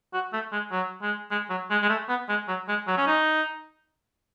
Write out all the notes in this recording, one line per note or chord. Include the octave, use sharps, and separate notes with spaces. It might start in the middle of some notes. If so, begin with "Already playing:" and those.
F#4
A3
G#3
F#3
G#3
G#3
F#3
G#3
G#3
A3
B3
G#3
F#3
G#3
F#3
C#4
D#4